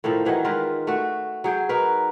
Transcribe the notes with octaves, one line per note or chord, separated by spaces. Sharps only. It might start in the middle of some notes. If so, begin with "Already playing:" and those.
A2 D#3 F3 A4
D#3 E3 F#3 D#5
D#3 G#3 F4 B4
A3 F#4
F#3 G#4 G5
D#4 F#4 A#4 B4